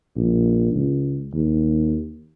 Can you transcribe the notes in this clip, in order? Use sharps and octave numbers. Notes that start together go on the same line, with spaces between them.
A#1
C#2
D#2